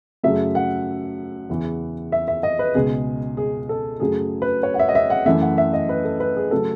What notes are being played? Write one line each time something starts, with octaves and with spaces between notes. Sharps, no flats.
F#2 C#3 F#3 A3 E5
F#5
E2 C#3 E3
E5
E5
D#5
B4
C#2 B2 G#3 G#4
G#4
A4
F#2 C#3 F#3 A3 G#4
B4
C#5
F#5
E5
D#5
E5
F#5
F#2 E3 A3 E5
F#5
E5
D#5
B4
A4
B4
G#4
C#3 F#3 A3 A4